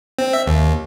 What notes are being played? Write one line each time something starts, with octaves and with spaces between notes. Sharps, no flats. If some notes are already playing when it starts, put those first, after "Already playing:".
C4
E5
D#2